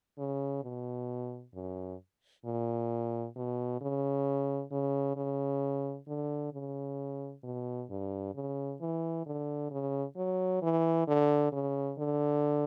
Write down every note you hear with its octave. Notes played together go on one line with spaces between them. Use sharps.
C#3
B2
F#2
A#2
B2
C#3
C#3
C#3
D3
C#3
B2
G2
C#3
E3
D3
C#3
F#3
E3
D3
C#3
D3